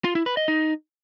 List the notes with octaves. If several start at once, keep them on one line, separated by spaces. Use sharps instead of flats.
F4
E4
B4
D#5
D#4